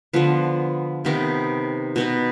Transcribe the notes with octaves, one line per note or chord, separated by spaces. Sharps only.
D3 F3 B3
C3 D#3 B3 D#4
B2 B3 D#4